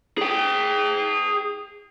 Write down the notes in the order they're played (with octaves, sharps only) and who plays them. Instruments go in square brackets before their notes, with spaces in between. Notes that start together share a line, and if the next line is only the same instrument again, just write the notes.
[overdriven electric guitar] G#4 G5